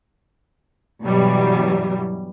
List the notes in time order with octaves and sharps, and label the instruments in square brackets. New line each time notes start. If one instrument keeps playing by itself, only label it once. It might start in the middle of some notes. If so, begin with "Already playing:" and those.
[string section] G2 B2 E3 F#3 G3